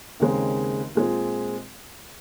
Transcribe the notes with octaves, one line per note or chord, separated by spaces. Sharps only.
D#2 C#3 G#3 C4
A#2 G#3 C4